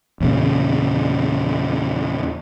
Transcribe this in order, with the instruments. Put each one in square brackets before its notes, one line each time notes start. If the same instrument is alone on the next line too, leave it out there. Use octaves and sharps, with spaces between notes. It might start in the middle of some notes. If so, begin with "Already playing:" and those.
[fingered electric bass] E2 A#2 C#3